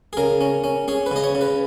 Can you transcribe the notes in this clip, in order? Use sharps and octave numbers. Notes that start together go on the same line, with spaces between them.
G#4
C#3 A#4
C#4
C#4
C#4 G#4
B4
C#3 D#5
C#5
C#3
B4